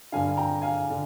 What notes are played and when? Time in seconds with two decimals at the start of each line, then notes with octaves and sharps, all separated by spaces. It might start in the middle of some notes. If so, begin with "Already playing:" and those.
0.12 G2 D3 F5 G#5
0.37 G5 A#5
0.62 F5 G#5
0.90 D3